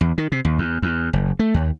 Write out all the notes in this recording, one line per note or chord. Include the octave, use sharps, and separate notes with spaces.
E2
D#3
C3
D#2
E2
E2
F#1
A3
D#2